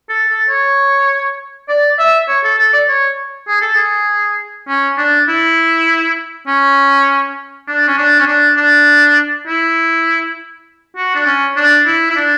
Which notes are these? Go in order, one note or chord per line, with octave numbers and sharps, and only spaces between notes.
A4
A4
C#5
D5
E5
C#5
A4
A4
D5
C#5
G#4
A4
G#4
C#4
D4
E4
C#4
D4
C#4
D4
C#4
D4
D4
E4
F#4
D4
C#4
D4
E4
E4
D4